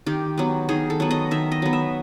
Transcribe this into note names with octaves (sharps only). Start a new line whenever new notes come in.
D#3 G4
F#3 B3
D#3 G#4
A4
F#3 B3
D#5
D#3 E5
D#5
F#3 B3
E5